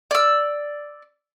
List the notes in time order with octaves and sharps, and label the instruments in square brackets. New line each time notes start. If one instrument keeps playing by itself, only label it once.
[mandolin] D5 E6